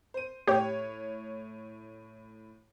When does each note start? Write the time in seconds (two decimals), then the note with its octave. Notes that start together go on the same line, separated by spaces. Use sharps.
0.14 C5 D#7
0.48 A2 G4 C#5